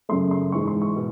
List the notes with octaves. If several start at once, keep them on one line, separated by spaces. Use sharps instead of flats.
F#2 C#3 F#3 A3 C6
C6
G#2 E3 G#3 C#6
C6
C#6
B2